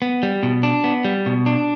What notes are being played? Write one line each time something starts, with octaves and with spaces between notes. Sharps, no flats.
B3
G3
B2
D4
B3
G3
B2
D4